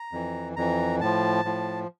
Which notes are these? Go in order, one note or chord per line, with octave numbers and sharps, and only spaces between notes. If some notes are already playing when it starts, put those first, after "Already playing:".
Already playing: A#5
F2 E3
F2 E3 A#5
A2 F3 A5
A2 F3